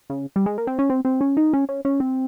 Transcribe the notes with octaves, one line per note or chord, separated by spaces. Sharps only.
C#3
G3
G#3
A#3
C4
C#4
C4
C4
C#4
D#4
C#4
C#4
C#4
C4